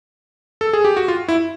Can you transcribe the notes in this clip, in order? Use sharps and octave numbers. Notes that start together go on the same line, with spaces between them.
A4
G#4
G4
F#4
F4
E4